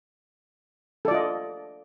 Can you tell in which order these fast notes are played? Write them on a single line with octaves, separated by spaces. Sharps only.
A4 D5 F4 D#5